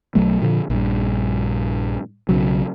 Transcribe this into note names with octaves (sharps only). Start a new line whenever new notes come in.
B1 F#3 A3
A#2 D3 F3
A#1 G2
B1 C#3 F#3